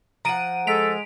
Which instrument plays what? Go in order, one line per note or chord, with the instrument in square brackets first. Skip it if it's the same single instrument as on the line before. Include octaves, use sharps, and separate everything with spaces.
[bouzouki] F3 F#5 [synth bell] A#5 D7 D#7
[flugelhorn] G#3 [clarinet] A4 [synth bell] B6 D7 F7